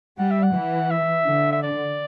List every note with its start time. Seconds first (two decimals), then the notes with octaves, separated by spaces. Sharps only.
0.18 G3 F#5
0.31 E5
0.43 F#5
0.55 E3
0.91 E5
1.27 D3
1.52 E5
1.62 D5